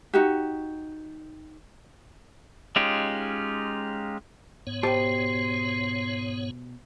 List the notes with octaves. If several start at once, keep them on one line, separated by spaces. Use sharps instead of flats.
D#4 F#4 G4
G#3 C#4 D#4 F4 G4
G#2 B3 C#5
B2 G4 C5 G5 A5 C6